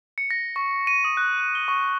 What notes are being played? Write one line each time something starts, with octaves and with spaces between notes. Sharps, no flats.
C#7
A#6
C#6
D#7
D#6
F#6
F#6
G7
C#6